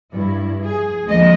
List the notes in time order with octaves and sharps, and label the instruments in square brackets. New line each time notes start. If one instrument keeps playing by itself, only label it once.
[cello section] G2 E4
G#4
D2 F3 G#3 A#3 D#5